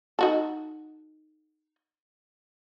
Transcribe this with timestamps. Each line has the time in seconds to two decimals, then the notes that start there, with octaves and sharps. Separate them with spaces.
0.19 D#4 F#4 A4